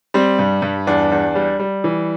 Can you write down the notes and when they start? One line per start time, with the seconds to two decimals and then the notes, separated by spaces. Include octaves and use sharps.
0.14 G3 C4
0.39 G2
0.62 G2
0.87 E2 D4
1.12 E2
1.35 G3
1.59 G3
1.84 E3